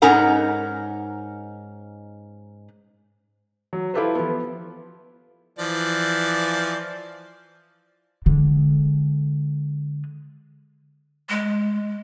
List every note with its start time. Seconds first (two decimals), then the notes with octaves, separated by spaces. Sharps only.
0.02 G#2 C#4 D#4 A#4 F#5
3.73 F#3
3.94 E4 F4 G4 A4 B4 C5
4.15 F3 B3
5.59 E3 F3 D5
8.26 D3 G#3
11.30 G#3